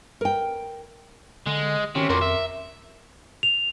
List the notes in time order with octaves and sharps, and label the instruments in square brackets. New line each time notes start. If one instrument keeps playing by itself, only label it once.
[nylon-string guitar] A#4 G5
[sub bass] D3 [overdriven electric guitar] G#3
[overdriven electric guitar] C3 [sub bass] D#3 [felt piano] C#4
[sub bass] F2 [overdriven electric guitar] A#2 F#4 [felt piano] A#4 C6 D6
[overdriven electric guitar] E5
[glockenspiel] F7